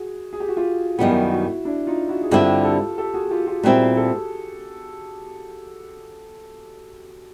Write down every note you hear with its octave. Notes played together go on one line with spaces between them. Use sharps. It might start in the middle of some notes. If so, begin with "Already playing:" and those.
Already playing: F#4 G#4
G#4
G4
F#4
F4 G4
F#2 D#3 G3 B3 E4 F#4
E4 F#4
D4 E4
D#4 F4
E4 F#4
G#4
G2 D3 G3 C4 E4 F4 G4
G4 A4
G4 A4
F#4 G#4
F4 G4
F4 G4
A#2 G3 C4 E4 F#4 G#4
G4 A4